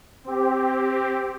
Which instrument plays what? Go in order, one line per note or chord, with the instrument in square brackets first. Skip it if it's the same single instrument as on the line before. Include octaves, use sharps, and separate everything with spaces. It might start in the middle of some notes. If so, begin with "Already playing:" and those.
[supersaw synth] C4 G4